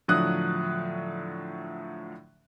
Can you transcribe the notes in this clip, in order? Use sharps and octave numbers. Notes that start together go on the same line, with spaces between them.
A2 D3 F3 F#3 D#6 F#6